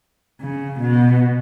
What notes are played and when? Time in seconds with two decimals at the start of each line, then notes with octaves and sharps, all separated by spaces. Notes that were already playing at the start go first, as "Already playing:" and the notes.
0.42 C#3
0.80 B2